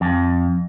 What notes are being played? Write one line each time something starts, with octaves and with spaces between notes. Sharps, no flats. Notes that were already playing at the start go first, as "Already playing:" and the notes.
F2